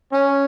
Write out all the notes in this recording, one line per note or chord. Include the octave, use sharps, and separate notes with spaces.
C#4